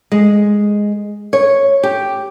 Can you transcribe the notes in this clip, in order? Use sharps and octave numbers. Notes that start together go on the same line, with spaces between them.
G#3
C#5
G4